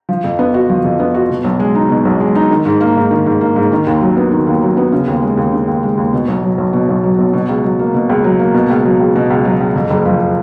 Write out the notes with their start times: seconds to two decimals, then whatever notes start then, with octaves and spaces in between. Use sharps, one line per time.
0.09 F3
0.24 F2
0.39 B3
0.54 F#4
0.69 F3
0.84 F2
1.00 B3
1.14 F#4
1.30 B2
1.44 B1
1.60 G#3
1.75 D#4
1.90 B2
2.05 B1
2.20 G#3
2.35 D#4
2.50 D#3
2.66 G#2
2.81 A#3
2.95 G#2
3.11 D#3
3.26 G#2
3.41 A#3
3.56 G#2
3.72 D#3
3.87 D#2
4.01 F#3
4.17 B3
4.32 D#3
4.47 D#2
4.62 F#3
4.77 B3
4.92 C#3
5.08 D#2
5.22 G#3
5.37 D#2
5.52 C#3
5.68 D#2
5.83 G#3
5.97 D#2
6.13 B2
6.28 B1
6.43 F#3
6.58 B1
6.73 B2
6.88 B1
7.04 F#3
7.19 B1
7.33 B2
7.49 C#2
7.64 F#3
7.79 A#3
7.94 B2
8.09 C#2
8.24 F#3
8.39 A#3
8.54 B2
8.70 C#2
8.85 F#3
9.00 C#2
9.16 B2
9.30 C#2
9.45 F#3
9.60 C#2
9.76 F2
9.90 F#1
10.05 F3